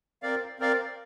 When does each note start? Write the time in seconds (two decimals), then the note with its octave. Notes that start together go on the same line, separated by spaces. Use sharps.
0.22 C4 A#4 D5 F5
0.59 C4 A#4 D5 F5